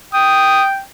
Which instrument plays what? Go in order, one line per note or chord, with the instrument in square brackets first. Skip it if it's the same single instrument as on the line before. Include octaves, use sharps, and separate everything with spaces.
[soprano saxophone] G5 [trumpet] D#6